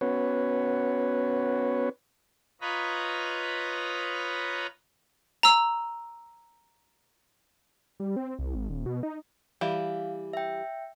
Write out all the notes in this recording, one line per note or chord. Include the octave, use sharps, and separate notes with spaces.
B3 C#4 F#4 B4 C#5
F4 B4 C#5 D#5 A#5 B5
A#5 E6
G3
C4
C2
G#1
D#1
B2
D#4
E3 G3 F5
E5 G5